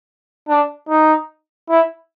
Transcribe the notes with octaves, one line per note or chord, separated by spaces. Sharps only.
D4
D#4
E4